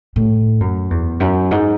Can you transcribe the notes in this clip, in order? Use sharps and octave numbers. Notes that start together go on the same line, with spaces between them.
A2
F#2
E2
F#2
G#2